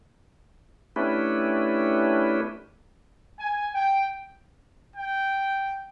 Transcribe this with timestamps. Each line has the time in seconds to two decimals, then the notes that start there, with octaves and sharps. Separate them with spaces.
0.96 A3 C#4 D4 E4 G4 B4
3.39 G#5
3.74 G5
4.96 G5